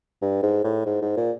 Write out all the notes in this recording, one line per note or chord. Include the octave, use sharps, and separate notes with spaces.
G2
G#2
A2
G#2
G#2
A#2